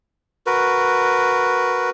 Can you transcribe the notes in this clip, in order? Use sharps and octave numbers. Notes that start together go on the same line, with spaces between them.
F#4 A#4 B4